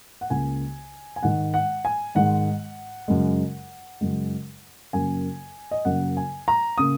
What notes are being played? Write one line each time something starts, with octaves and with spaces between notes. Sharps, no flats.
F#5
C#2 C#3 A#3 G#5
G#5
G#2 D#3 G#3 F#5
F#5
G#5
G#2 D#3 G#3 F#5
F#2 C#3 G#3
F#2 C#3 G#3
F#2 C#3 A#3 G#5
D#5
F#2 C#3 A#3 F#5
G#5
A#5
C#3 A#3 D#6